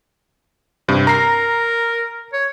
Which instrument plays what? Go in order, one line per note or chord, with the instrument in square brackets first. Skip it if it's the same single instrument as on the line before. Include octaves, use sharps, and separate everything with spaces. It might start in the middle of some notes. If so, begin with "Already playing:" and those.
[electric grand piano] G2 C3
[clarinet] A#4 [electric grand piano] A#5 C7
[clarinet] C#5